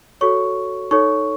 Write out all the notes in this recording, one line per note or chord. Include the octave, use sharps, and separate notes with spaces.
F#4 A4 C#5 C#6
D#4 A4 C#5 C#6